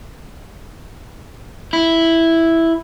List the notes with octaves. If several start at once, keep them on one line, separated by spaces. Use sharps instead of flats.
E4